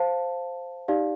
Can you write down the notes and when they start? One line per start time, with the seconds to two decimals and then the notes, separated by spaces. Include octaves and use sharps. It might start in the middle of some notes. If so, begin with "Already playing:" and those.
Already playing: C5 F5 A5
0.88 D#4 G4 D5 F5